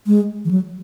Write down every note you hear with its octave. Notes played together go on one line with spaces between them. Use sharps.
G#3
E3
F#3